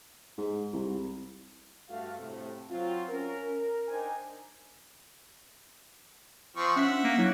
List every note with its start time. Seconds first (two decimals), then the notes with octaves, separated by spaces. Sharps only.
0.38 G#2
0.73 C2
1.89 G2 A3 F#4 F5
2.19 A2 C3 A3 C4
2.70 F#3 C4 F4
3.09 C#4 A#4
3.57 A#4
3.87 D4 D#4 A#4 C5 G5 G#5
6.56 F3 C4 C#6
6.76 C#4 E5 F#5 B6
6.90 D4
7.04 A#3
7.18 F#3 E4